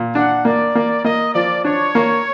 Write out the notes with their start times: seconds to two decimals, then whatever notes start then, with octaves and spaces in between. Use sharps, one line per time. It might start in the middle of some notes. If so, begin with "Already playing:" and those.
Already playing: A#2
0.15 D4 F#5
0.45 A#3 D5
0.75 A#3
1.04 A#3 D#5
1.34 F3 D5
1.65 D4 C#5
1.95 A#3